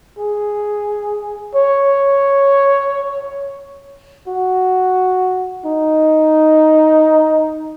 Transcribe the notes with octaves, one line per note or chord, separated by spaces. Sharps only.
G#4
C#5
F#4
D#4